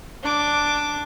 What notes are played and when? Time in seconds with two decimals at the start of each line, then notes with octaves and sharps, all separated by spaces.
0.23 D4 D6